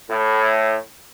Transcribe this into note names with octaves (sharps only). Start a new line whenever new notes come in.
A2